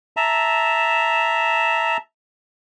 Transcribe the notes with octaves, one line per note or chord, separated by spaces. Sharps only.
E5 A5 A#5